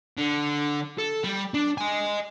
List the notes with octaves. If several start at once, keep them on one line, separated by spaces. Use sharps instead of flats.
D3
A4
G3
D4
D#5 G#5